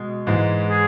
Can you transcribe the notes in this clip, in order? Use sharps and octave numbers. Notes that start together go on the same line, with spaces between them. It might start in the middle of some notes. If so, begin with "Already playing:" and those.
Already playing: B2 G#3
G#2 E3 G#3
G#4